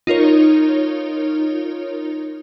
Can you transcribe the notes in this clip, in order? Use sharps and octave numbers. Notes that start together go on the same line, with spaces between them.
D#4 F4 A#4 C#5